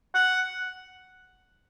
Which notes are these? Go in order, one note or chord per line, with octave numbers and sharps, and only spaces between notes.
F#5